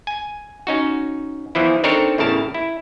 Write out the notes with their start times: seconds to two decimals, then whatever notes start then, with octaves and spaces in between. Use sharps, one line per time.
0.07 G#5
0.67 C#4 D#4 F#4
1.55 E2 E3 F3 E4
1.84 C4 D4 D#4 A4 A#4 C#5
2.18 E2 A2 C#3 A#4 A5
2.54 E4